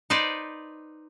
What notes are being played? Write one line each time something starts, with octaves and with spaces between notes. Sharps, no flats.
D#4 B4 C5 D5